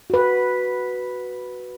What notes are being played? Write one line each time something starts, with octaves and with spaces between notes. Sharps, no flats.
F#4 B4